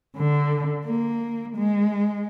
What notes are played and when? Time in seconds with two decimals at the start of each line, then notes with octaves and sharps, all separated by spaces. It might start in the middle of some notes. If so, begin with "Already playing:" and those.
0.17 D3
0.86 A#3
1.57 G#3